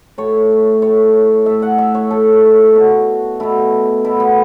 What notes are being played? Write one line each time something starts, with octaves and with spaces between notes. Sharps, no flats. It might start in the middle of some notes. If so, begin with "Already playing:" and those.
A2 A3 C#5
A2 A3 C#5
A2 A3 E5
F#5
E5
C#5
A2 A3 A4
B2 A3 F#4
B2 A3 E4
B2 A3 E4
B3